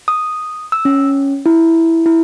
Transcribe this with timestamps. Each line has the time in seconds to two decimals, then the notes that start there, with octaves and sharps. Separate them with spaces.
0.08 D#6
0.72 E6
0.85 C#4
1.46 E4
2.06 E4